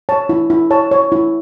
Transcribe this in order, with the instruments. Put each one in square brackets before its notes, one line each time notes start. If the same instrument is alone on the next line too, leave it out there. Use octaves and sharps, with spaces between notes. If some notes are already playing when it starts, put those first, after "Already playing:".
[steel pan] C#5 A5
E4
E4
C#5 A5
C#5
E4